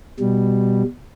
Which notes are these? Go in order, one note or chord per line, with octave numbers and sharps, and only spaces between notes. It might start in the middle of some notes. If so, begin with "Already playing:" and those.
B2 G3